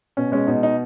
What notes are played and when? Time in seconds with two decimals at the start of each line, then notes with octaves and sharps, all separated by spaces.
0.17 B2 C#4
0.32 G#3 C#4
0.47 B2 D#4
0.63 D#4